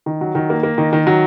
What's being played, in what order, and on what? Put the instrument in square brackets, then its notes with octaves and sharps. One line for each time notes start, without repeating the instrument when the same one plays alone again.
[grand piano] D#3
F#3
D#3
A#3
A#3
D#3
D#3
F#3